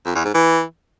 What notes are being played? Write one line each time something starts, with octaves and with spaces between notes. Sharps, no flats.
F2
E2
G#2
E3